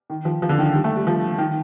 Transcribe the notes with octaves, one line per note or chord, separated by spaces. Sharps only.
D#3
F3
F3
D3
D#3
G3
A3
G3
F3
D#3